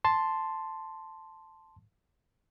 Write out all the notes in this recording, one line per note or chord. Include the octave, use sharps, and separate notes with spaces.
A5 C6